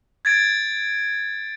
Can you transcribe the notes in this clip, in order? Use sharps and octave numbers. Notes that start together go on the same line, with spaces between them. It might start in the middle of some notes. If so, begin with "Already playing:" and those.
G#6 A6 D7